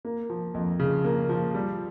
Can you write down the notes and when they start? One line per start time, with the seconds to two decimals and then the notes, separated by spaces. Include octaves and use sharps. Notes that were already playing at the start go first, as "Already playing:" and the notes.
0.05 A#3
0.30 F3
0.54 F2
0.79 C#3
1.04 A#3
1.29 F3
1.54 G3